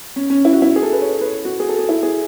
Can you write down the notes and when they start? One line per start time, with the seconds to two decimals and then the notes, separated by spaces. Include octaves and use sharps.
0.16 C#4
0.30 C#4
0.45 E4
0.53 F#4
0.62 E4
0.76 G#4
0.83 A4
0.93 B4
1.02 C#5
1.21 B4
1.45 F#4
1.60 G#4
1.69 A4
1.79 G#4
1.89 E4
2.03 G#4